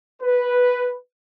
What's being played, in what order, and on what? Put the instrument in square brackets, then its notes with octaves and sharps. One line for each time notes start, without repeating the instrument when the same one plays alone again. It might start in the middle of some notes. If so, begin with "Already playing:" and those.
[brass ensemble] B4